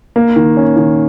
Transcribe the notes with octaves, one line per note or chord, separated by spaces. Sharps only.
A#3
D#3
C#4
D#3